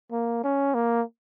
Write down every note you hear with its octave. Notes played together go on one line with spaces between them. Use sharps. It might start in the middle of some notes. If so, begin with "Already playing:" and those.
A#3
C#4
A#3